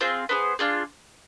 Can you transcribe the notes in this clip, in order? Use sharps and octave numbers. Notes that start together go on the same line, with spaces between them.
C4 F4 G#4 C5
B3 D4 G#4 C5
D4 F4 G#4